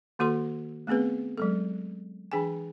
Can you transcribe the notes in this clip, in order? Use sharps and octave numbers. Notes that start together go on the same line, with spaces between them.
D#3 A#3 F#4 A4 C6
A3 B3 C4 G#4 B4
F#3 G#3 A4
E3 D4 G#4 G5 G#5